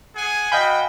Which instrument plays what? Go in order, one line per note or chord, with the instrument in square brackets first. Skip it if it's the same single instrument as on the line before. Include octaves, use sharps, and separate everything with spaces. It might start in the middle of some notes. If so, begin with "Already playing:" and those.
[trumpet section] G#4 F#5 G#5
[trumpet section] F#4 G5 [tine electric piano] D#5 F5 G#5 [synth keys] B5 G6 B6